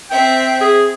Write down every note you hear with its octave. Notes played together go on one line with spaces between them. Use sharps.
C4 E5 G5
G#4